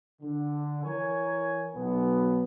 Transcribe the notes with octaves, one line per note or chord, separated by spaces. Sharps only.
D3
E3 A#4 C#5 G#5
B1 B3